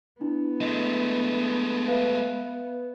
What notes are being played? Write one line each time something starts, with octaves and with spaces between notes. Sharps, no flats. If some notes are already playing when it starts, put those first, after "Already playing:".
B3 D4 E4
G#3 A3 D#5
B4 E5 F5